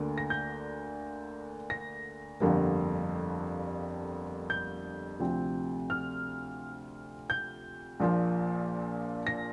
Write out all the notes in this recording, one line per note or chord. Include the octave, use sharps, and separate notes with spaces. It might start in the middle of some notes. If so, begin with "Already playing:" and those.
Already playing: D2 D3 A#3
A#6
G6
A#6
G1 F2 D3 G3 A#3
G6
D2 C3 F3 C4
F6
G6
A#1 A#2 F3
A#6